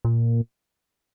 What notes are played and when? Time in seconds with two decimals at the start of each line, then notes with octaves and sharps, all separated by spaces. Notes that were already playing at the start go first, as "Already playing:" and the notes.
0.05 A#2